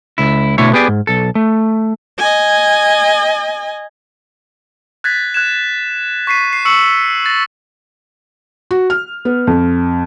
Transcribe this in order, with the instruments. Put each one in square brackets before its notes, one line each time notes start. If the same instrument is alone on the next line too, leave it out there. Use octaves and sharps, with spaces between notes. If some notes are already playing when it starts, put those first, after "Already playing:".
[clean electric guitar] C#2 E4
B2 D3 A3 E4 C#5
B3 G4 G#4 D5
G#2
B1 A4
A3
[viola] D#5 G#5
[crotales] F#6 G#6 A6 B6
F#6 G#6 E7
C#6 B6 C7 D#7
C7
C#6 E6 C#7 F#7
A6 A#6
[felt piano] F#4
F6
B3
F2